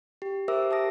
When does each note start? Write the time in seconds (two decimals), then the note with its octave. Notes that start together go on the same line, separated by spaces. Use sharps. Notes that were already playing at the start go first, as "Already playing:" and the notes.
0.22 G4
0.48 G4 A#4 C5 E5 D6 E6
0.71 G4 A5 D#6 A#6 D7